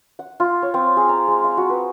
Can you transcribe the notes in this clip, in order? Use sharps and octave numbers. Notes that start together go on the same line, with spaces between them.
F#5
F4
C#5
C4
G#4
A#5
G#3
F5
F#4
B4